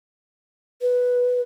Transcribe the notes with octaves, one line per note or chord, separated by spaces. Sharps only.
B4